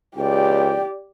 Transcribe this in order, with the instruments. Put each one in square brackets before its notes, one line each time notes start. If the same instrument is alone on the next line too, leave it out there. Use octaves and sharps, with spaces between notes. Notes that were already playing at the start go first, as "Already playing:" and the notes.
[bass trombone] C#2 [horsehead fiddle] G4 D5 [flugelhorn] G5